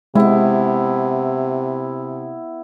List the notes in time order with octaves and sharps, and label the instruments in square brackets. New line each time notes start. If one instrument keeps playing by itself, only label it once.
[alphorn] C3 [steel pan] G#3 [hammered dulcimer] B3 E4